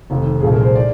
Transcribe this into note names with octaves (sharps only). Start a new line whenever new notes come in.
F1 D#2 D#3
C2 A#2 F3 G#4
A#4
C5
D#3 D5